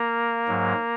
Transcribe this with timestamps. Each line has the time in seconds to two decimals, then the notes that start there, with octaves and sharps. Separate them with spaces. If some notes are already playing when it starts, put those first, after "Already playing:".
Already playing: A#3 A#4
0.48 G#2 F#3